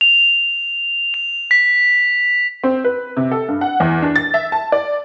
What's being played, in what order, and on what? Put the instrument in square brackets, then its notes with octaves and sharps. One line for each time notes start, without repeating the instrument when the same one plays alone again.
[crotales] F7
F7
B6
[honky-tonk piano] C4
B4
C3
A4
G2
F#5
E2
D4
A6
E5
A5
D5